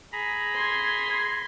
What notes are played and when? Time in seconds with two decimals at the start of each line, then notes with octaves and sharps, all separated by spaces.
0.12 G#4 A#5 B5
0.54 C6 G#6